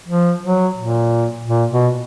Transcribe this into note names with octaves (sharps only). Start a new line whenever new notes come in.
F3
F#3
A#2
A#2
B2